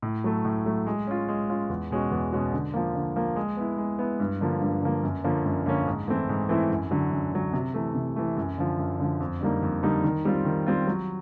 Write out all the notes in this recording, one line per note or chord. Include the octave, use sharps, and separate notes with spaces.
A2
F#3 A3
A2
F#3 A3
G#3
C#4 F4
G#3
C#4 F4
E2
B2 G#3 C#4 F#4
E2
B2 G#3 C#4 F#4
D3
F3 A#3
D3
F3 A#3
G#3
B3 E4
G#3
B3 E4
G2
D3 F3 A#3
G2
D3 F3 A#3
F#2
D3 F3 A#3 C#4
F#2
D3 F3 A#3 C#4
G#2
E3 A3 C4 E4
G#2
E3 A3 C4 E4
F#2
D3 F#3
F#2
D3 F#3
C3
E3 A3
C3
E3 A3
F#2
D3 F3
F#2
D3 F3
F2
D3 G3 A#3 D#4
F2
D3 G3 A#3 D#4
D#3
G3 C4 F4
D#3
G3 C4 F4
F#3